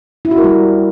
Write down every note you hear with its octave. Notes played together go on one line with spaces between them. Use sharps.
E4
F#4
A#4
G3